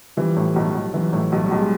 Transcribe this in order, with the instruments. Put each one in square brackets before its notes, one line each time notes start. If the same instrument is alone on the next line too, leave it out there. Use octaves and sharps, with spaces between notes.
[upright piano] E3 [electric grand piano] F3 G3
[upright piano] A2
B1
B1
[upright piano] E3 [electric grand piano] F#3
[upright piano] A2
B1
[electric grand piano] G3
[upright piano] B1
[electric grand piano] G#3